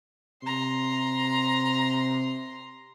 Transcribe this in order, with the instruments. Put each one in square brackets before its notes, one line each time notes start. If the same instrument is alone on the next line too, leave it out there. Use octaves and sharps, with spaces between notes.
[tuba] C3 [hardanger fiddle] A#5 C6